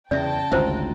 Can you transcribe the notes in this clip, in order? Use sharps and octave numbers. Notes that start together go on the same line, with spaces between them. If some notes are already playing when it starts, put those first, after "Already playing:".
E2 C#3 D5 E5 G5 A5
G#1 D2 C#3 F4 C5 E5 A#5